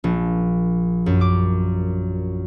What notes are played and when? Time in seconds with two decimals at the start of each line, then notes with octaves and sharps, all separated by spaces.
0.04 A#1
1.06 F#2
1.21 D6